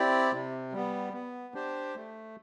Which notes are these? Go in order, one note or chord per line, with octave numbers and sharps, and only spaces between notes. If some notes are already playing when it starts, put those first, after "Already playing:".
Already playing: C4 E4 G4 D5
C3
G3 B3
B3
D4 G4 C5
A3